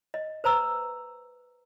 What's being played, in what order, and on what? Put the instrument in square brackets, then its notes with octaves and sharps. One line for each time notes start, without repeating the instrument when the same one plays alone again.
[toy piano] D#5
B4 C5 A#5 E6